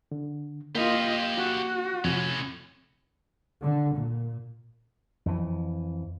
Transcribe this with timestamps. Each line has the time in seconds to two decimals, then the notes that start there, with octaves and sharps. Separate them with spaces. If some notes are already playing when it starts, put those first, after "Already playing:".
0.11 D3
0.75 A#3 F4 G4 D#5 F5
1.37 F#4
2.04 F2 A2 C3 C#4
3.61 D3
3.94 A#2
5.26 F2 E3